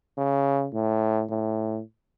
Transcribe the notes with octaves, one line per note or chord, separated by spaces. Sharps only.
C#3
A2
A2